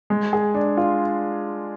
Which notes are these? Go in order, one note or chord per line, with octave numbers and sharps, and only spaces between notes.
G#3
G#4
D4
F4